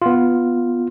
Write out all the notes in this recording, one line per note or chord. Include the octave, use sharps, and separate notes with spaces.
B3 F4